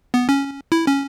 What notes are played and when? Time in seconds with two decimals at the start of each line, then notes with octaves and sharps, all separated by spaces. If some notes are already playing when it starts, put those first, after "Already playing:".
0.14 B3
0.29 C#4
0.72 E4
0.87 C#4